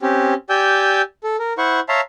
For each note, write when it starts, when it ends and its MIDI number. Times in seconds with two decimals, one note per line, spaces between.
0.02 0.34 60
0.02 0.34 61
0.02 0.34 67
0.50 1.02 67
0.50 1.02 74
0.50 1.02 79
0.50 1.02 80
0.50 1.02 88
0.50 1.02 91
1.24 1.36 69
1.39 1.53 70
1.58 1.80 64
1.58 1.80 72
1.58 1.80 78
1.58 1.80 85
1.89 2.01 73
1.89 2.01 76
1.89 2.01 77
1.89 2.01 81
1.89 2.01 82
1.89 2.01 84